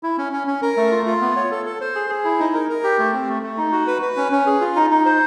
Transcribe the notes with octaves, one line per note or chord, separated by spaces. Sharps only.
E4
C#4
C#4
C#4
A#4
A3
F4
F4
B3
C#5
A4
A4
C5
G#4
G#4
E4
D#4
A#4
A#4
G4
A3
C4
A3
A3
D#4
F#4
B4
B4
C#4
C#4
G#4
F4
D#4
D#4
C5